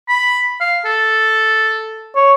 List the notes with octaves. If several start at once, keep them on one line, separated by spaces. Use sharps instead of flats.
B5
F5
A4
C#5